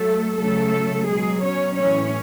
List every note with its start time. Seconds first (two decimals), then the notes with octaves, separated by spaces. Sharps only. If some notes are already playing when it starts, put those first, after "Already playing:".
Already playing: F#3 A3 A4
0.38 C#3 F#3 A3 A4
1.08 B2 F#3 G#3 G#4
1.43 C#4 C#5
1.77 A2 E3 C#4 C#5